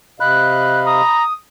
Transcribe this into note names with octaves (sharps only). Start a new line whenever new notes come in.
C3 D#5 F5 B5 F#6
A#5 D#6